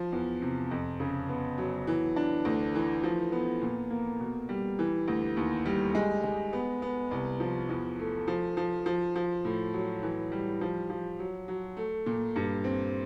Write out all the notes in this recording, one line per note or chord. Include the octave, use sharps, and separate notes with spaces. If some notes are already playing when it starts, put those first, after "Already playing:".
Already playing: F3
E2
C3
F2
C#3
B3
F#3
E3
D4
D2
E3
F3
B3
A#2
A#3
B2
G3
E3
D2
D#2
G3
G#3
G#3
B3
B3
C2
F3
E2
A3
F3
F3
F3
F3
A2
F#3
E3
G3
F3
F3
F#3
F#3
A3
A#2
G2
C4